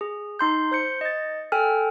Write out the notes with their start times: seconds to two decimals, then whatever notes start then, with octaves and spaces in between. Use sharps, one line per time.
0.01 G#4
0.39 D#4 C6 G6
0.71 C5 G6 C#7
1.01 D#5 A6
1.52 A4 G5 G#5 F6